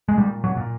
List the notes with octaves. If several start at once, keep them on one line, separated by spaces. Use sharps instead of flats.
G#3
A#2 G3
F#3
A#2